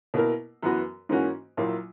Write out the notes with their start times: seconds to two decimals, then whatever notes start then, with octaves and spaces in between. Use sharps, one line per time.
0.14 B2 A#3 E4 A#4
0.62 F#2 E3 B3 F#4 B4
1.09 G#2 E3 A#3 C#4 F#4
1.57 A#1 A#2 F#3 A#3 E4